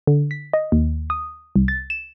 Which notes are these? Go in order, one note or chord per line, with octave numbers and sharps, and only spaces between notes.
D3
B6
D#5
D#2
D#6
C2
A6
E7